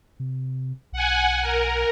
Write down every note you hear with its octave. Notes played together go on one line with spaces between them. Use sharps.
C3
B1 F#5 G#5
A#4